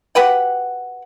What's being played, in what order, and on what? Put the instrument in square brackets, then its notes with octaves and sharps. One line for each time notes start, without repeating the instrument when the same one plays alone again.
[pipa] F#4 G4 B4 F#5